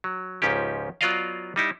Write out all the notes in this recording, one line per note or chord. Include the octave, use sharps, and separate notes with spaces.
F#3
C#2 G#2 F3 C#4 G4
F#3 B3 F4 D5 D#5 F5
G3 D#4 E4